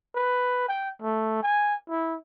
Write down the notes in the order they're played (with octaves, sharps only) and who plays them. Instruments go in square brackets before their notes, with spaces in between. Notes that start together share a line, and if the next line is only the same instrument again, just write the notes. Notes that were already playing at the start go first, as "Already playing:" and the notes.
[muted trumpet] B4
G5
A3
G#5
E4